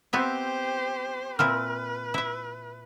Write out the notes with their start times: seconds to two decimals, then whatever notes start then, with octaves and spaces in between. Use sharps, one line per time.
0.13 B3 C4 G4 C5 E5
1.39 A#2 C4 E4 B4 F6
2.14 E4 E5